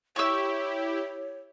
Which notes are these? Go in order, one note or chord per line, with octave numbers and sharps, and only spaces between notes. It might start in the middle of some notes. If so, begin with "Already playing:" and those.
E4 G4 C#5 C#6 E6